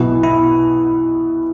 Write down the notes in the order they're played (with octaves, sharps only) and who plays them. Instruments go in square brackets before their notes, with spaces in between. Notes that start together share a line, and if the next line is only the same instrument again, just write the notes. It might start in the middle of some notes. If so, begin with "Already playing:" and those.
Already playing: [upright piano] B1 B2 B3 [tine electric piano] E4
[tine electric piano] E4